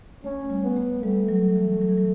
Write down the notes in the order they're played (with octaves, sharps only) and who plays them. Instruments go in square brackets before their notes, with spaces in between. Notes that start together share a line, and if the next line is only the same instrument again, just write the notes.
[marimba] A3 [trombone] C#4
[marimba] G3
[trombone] B3
[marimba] A3
[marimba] G3 [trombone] A3
[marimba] F#3
E3
F#3
E3
F#3